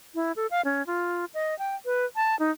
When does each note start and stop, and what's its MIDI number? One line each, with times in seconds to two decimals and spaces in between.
0.15 0.32 64
0.36 0.47 69
0.51 0.61 77
0.65 0.85 61
0.87 1.25 65
1.34 1.57 75
1.59 1.75 79
1.85 2.05 71
2.16 2.38 81
2.39 2.51 63